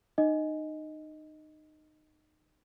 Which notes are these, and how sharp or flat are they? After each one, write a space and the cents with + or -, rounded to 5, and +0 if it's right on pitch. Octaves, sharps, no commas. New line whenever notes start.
D#4 -25 D#5 +5